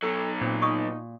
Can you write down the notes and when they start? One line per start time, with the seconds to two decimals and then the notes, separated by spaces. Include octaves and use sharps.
0.03 B2 F#3 A4
0.41 A#2 C4
0.62 D#4 C#6 D#6